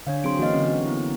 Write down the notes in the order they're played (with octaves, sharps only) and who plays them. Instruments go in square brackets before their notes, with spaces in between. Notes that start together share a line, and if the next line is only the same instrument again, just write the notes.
[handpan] D3 [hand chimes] D4 C#5 F5
[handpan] F#3 C4 G#4 [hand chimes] C6 D7
[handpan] E3 A#3 F5 [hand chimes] F#4 C#5 D#5
[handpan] D3 C#4 [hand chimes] C4
[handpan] F#4
[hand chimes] B3 E4